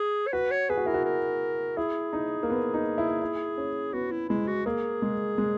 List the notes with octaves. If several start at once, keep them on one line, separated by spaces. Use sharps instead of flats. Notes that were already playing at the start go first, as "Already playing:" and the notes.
Already playing: G#4
C#5
F#4 B4
C#5
G#4 B4
F#4
E4 A#4
F#4
A#4
E4 G#4
D#4
A#3
B3
D#4
E4
E4
C#4
B3 F#4
E4
G#3 E4
F#4
A#3 G#4
G#3
G#3